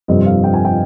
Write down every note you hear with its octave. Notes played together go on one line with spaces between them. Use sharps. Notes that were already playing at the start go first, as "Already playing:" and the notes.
G1 F2 C3 G3 C4 D#5
F5
G5
G#5
G5